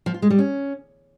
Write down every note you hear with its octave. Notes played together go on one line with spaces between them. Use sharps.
F3
F4
G#3
G3
C#4